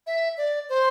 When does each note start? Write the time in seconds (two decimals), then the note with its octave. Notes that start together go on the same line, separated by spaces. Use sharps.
0.07 E5
0.37 D5
0.69 C5